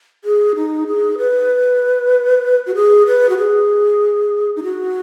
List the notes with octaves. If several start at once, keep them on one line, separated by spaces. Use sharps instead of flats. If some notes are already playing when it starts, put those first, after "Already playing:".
G#4
D#4
G#4
B4
F#4
G#4
B4
F#4
G#4
D#4
F#4